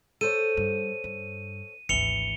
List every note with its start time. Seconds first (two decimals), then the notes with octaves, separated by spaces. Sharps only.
0.21 A4 C5 C#5 D#7
0.57 G2
1.04 G2
1.89 G#1 D2 E3 C#7 F7 G7